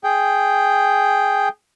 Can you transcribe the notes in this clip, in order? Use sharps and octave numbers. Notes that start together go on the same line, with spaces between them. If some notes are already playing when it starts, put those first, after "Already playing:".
G#4 G5